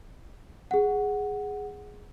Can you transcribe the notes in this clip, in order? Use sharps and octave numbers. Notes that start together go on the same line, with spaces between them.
G#4 F#5